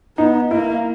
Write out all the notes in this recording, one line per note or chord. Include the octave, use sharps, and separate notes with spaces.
B3 D#4
A#3 E4